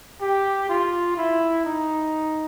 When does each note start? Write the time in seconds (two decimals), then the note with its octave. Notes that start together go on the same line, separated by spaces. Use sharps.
0.21 G4
0.69 F4
1.17 E4
1.65 D#4